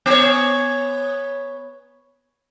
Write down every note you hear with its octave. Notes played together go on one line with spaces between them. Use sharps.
B3 C#5